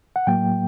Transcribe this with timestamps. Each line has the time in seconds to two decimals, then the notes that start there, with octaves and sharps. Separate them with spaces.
0.16 F#5
0.27 A2 F#3 A#3 G5